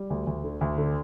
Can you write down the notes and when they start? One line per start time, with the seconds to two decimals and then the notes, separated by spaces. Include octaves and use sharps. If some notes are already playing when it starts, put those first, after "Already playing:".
Already playing: G3
0.10 D2
0.27 D2
0.44 D3
0.61 D2
0.78 D3